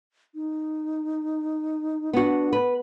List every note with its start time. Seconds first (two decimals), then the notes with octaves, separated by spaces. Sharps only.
0.35 D#4
2.13 B3 D4 F#4
2.53 B4